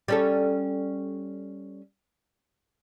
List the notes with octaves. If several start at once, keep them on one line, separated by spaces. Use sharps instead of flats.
G3 C#4 A4